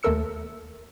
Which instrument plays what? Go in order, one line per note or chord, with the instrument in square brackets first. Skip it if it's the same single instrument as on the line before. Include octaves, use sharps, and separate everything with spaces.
[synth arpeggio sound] D#2 A3 A4 A#4 E6 C#7